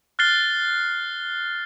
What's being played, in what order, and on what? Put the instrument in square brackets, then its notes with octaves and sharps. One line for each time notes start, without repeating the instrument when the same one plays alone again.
[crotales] F6 F#6 A6 C7 G7